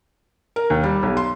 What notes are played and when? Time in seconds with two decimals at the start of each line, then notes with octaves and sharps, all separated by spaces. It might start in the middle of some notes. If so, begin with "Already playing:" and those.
0.56 A#4
0.70 D#2
0.83 G3
1.03 B1
1.17 C6